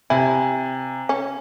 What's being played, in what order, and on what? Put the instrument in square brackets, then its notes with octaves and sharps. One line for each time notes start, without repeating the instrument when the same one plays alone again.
[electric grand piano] C3 G#5 [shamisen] E4
[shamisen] C#4